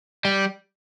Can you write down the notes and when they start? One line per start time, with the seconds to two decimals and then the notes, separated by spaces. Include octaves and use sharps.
0.25 G3